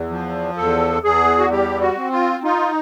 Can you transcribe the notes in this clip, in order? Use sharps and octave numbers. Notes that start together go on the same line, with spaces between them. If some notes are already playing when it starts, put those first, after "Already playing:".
Already playing: E2
F3
E2 A4
E2 G#4
F#4
G3 G4
F#4
C4
F4
D#4 F4